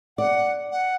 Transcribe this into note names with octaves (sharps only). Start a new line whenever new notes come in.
D5 F#5
F#5